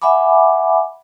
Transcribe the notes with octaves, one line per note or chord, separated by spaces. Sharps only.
E5 F#5 G#5 B5 D6